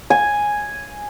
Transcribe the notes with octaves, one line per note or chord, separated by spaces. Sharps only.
G#5